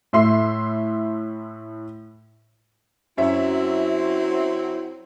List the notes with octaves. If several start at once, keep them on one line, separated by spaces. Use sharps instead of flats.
A2 E5 C6 C7
F#2 F#3 C4 C#4 E4 E5